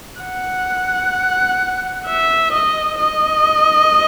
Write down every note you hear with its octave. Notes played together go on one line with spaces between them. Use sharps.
F#5
E5
D#5
D#5